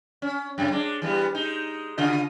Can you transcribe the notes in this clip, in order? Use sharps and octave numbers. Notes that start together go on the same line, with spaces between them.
C#4
F#2 C#3
G#3 D4
E3 G3 B3
G#3 D#4
C#3 F4 D#5